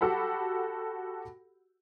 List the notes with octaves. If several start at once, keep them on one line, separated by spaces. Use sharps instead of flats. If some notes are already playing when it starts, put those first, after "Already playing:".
F#4 G4 A4 F#5 B5